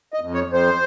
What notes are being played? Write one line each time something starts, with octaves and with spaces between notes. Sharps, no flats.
D#5
F2
C#5
F2
C5